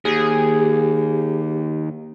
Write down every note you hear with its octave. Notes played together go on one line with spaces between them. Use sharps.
D#2 G4 G#4